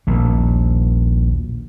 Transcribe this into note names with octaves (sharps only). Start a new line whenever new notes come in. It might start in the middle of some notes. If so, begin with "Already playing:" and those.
A#1 D#2